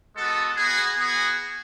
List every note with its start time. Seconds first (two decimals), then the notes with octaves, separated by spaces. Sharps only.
0.15 G#3 B3 F#4 A4
0.56 B3 F#4 G#4
0.97 B3 F#4 G#4